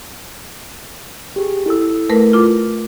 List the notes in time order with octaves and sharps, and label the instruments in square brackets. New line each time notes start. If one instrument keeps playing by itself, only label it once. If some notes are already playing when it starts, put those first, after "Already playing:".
[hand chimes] G4 G#4
E4 A4 E6
[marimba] A3 A#4 B4
F4 D6